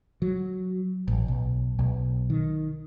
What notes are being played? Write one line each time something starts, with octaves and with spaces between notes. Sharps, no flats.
F#3
A1
B1
B1
D#3